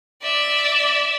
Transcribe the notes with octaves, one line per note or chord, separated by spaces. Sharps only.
D5 E5